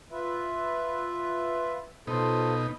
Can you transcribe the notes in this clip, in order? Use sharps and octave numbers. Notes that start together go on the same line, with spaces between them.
F4 B4 E5
B2 D#4 F4 A4 C5